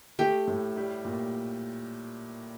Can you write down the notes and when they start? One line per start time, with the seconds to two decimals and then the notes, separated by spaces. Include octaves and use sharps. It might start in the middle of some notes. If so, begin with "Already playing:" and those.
0.19 A3 G4
0.47 A2
0.76 G3
1.05 A#2